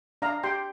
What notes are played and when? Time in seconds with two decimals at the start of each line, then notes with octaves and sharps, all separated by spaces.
0.22 D4 F5 A#5
0.43 G4 G5 C6